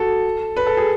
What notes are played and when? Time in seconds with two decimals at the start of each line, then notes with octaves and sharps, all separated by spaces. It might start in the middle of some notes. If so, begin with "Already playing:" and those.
Already playing: F#4 A4
0.57 B4
0.67 A4
0.77 G#4